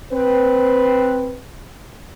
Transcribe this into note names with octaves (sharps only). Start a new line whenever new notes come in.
C4 B4